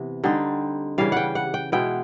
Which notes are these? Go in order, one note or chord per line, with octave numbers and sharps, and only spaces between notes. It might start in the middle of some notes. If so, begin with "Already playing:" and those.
Already playing: C3 E3 B3
D3 G3 C4 D#4
C#3 E3 G3 F5
F#5 G5
F#5
G5
B2 G#3 B3 E4 G5